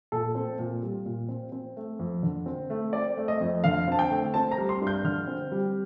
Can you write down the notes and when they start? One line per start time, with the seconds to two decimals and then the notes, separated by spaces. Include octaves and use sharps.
0.12 A#2 A4
0.35 C4
0.59 A#2
0.83 G3
1.06 A#2
1.29 C4
1.52 C4
1.77 A3
1.99 F2
2.23 D3
2.46 C4
2.70 A3
2.93 C4 D5
3.17 A3
3.28 D#5
3.41 F2
3.64 D3 F5
3.88 C4 A5
3.99 G5
4.10 A3
4.34 C4 A5
4.51 A#5
4.58 G3
4.69 C6
4.81 G2
4.87 G6
5.04 D3 F6
5.27 C4
5.52 G3